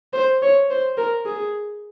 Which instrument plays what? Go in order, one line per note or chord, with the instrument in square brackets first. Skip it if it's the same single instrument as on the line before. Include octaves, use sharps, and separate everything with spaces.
[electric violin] C5
C#5
C5
A#4
G#4